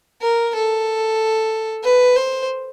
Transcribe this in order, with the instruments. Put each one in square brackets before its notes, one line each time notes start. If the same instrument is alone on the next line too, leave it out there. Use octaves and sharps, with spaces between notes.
[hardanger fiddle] A#4
A4
B4
C5